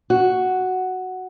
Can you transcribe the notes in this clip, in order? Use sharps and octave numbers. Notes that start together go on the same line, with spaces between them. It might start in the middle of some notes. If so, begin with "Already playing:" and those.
F#4